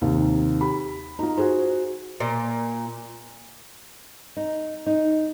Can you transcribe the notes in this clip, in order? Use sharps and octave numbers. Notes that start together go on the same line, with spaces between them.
D#2 C3 D#3
G4 B5
D#4 F4
F#4 G#4 C5
A#2
D#4
D#4